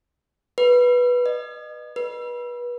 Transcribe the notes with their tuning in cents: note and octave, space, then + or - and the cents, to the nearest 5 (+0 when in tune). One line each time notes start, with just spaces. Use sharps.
B4 -10
D#5 -35
B4 -30